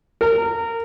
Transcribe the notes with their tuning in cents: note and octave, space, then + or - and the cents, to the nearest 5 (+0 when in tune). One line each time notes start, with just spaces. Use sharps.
A#4 -25